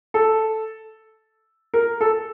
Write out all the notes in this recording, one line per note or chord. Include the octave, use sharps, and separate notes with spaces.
A4
A#4
A4